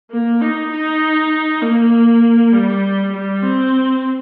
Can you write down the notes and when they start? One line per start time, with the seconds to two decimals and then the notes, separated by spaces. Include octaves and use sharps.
0.11 A#3
0.41 D#4
0.71 D#4
1.61 A#3
2.52 G3
3.12 G3
3.42 C4